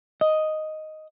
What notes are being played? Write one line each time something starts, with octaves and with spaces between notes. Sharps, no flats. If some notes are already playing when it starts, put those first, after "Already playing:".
D#5